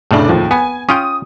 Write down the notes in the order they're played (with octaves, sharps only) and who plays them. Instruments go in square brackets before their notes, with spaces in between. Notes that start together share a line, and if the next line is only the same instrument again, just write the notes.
[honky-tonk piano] F1 D4 [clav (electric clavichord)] A2 C#3
[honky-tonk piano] D#2 F3
[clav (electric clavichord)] B3 [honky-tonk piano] G#5
[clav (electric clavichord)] C#4 F4 G5 [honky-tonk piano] D#6